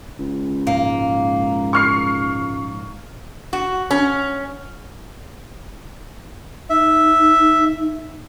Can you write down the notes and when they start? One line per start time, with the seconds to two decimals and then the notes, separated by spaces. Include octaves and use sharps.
0.19 C#2
0.67 A#1 G#2 A#3
1.73 C#6 F6 C7
3.53 F#4
3.91 C#4
6.70 D#4 E5